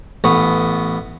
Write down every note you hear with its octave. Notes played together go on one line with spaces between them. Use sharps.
A1 B3 C#6